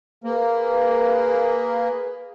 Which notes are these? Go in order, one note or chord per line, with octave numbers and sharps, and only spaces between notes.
A#3 G#4 B4